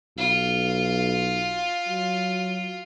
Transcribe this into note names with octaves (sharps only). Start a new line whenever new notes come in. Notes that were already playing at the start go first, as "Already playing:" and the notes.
B1 F4
F#3